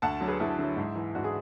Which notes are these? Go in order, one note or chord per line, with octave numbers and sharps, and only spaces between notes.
D2 F#5 A5
D3 F#3
G#4 B4
D2 E4 G#4
D3 F#3
G#2
E3
G#2 D4 F#4
E4 G#4